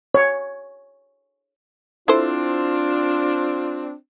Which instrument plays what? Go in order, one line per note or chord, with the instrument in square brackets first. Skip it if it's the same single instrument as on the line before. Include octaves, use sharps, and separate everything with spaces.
[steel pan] C#5
[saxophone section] C4 D4 [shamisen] E4 A4 C5 [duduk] F4